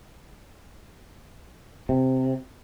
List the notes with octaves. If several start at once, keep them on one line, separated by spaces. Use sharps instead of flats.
C3